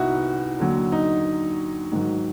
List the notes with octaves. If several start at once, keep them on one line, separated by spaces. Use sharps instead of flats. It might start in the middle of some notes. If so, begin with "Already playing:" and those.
Already playing: C2 G3 B3 D#4 E4 F#4
D#2 D3 F#3
D#4
G#2 D#3 F#3